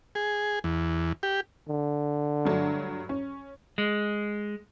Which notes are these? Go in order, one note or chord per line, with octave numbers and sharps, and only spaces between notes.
G#4
E2
G4
D3
G2 F#3 A3
C#4
G#3